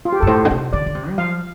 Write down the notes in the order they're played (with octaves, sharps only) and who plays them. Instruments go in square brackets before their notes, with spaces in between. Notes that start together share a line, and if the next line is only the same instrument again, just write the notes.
[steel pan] F4
G4
[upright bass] G2 [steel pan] A4
[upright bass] A2 [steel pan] C5
[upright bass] D3
C3
[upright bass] D3 [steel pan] D5
[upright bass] D3
C3
G3
[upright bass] F3 [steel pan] F5